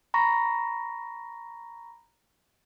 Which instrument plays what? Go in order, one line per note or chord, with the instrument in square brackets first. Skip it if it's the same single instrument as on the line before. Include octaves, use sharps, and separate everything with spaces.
[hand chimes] A#5 B5 C#6 A#6